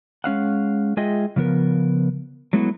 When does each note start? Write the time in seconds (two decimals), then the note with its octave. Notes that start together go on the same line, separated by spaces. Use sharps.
0.24 G#3 C#4 F5 F#5
0.97 G#3 F4 G#4 D#5 E5 G5
1.36 C#3 F3 B3 A#4
2.53 F#3 G#3 A3 B3 E4 F#4